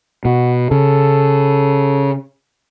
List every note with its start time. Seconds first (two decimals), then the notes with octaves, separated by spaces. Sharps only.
0.25 B2 F#4
0.71 C#3 A4